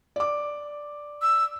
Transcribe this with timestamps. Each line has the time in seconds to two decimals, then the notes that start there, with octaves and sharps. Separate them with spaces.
0.16 D5 D6
1.22 E6